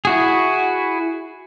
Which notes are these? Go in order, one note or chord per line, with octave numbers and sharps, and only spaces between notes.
E4 F#4 G#4